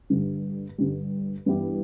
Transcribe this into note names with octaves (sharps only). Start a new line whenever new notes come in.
G2 D3 G3
G2 D3 G3
G2 E3 B3 E4 G4